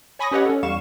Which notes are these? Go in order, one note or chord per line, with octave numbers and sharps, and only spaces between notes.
C#5 G#5 B5 C#6 D#6 A#6
C#4 G4 B4 C#5 D#5 F#5
C#4 A4
E2 G3 F5 C#6 E7